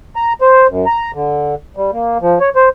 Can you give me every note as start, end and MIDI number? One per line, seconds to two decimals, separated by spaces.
0.16 0.33 82
0.41 0.67 72
0.69 0.85 42
0.86 1.11 82
1.14 1.55 50
1.77 1.91 55
1.93 2.18 58
2.21 2.38 53
2.40 2.50 73
2.56 2.69 72